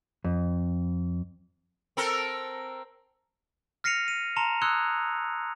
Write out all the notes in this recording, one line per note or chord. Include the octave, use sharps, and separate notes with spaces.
F2
C4 A4 A#4
F6 A#6 C7 C#7 D#7 F7
D#7
A5 A#5 C6 C#7 F7
C6 D#6 E6 F#6 G#6 C#7